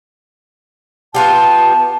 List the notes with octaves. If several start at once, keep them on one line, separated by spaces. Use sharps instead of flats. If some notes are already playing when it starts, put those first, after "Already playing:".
B3 F4 G4 A5